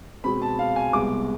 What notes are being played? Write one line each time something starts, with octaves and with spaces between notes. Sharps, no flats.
B2 G#3 C4 B5
A5
F5
G#5
C2 C3 G#3 B3 D6